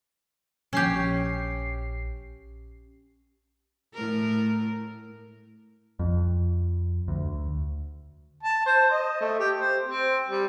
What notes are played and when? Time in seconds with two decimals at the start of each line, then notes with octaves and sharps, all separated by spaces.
0.73 A#1 C#4 G4 C7
3.94 A2 A#4
5.99 F2
7.08 D2
8.43 A5
8.66 C5
8.91 D#5
9.21 A3
9.39 G4
9.56 C5
9.84 C4
10.29 G3